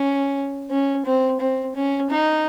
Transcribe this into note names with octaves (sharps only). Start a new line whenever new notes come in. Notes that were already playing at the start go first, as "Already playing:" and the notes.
Already playing: C#4
C#4
C4
C4
C#4
D#4